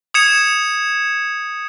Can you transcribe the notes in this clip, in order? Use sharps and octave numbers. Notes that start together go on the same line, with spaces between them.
D#6 G#6 C#7 E7